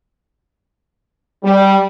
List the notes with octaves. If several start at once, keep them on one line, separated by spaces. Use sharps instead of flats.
G3